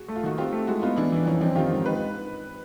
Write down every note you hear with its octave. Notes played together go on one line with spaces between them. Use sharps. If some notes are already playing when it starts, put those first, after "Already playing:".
Already playing: F#4 G#4
A3
F4
D#3 F#4
C4 F4 G4
A3
G#3 E4 F#4
B3 D#4 F4
E3 D4 E4
E3 D4
F2 C#4 D#4
F2 C4 D4
D#3 F4 G4
G#2
D#4 B4